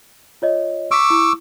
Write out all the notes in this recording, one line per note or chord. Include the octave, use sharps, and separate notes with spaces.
F4 C#5 D#5
C#6 D6 E6 B6 D7
E4